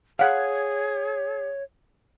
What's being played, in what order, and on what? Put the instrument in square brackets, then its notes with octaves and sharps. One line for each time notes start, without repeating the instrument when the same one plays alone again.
[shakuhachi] G#4 [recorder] C#5 [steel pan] F5 F#5